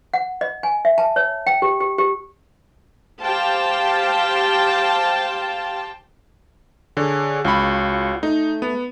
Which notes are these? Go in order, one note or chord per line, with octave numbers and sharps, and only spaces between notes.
F#5
D#5
G#5
E5
A5
C#5
G5
G4
G4
G4
G4 C5 F5 G5 A5
D3 G#4 C#5
C#2 F4 F#4 C#5 B5
A3 D#4
B3